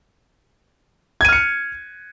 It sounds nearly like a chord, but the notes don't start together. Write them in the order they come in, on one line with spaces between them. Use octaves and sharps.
G#6 D#7 F6 C#7